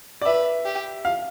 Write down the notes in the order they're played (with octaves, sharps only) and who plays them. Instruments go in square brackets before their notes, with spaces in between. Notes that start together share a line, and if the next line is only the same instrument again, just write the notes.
[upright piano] D5
[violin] B4 [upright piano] E5
[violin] G4
[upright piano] F5